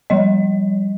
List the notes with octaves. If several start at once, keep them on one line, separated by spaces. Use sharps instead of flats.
F3 G3 D#5